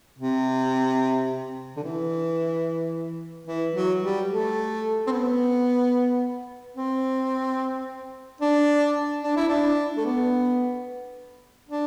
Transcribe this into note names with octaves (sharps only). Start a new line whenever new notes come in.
C3
D3
E3
E3
F#3
G3
A3
C4
B3
C4
D4
D4
E4
D4
A3
B3
D4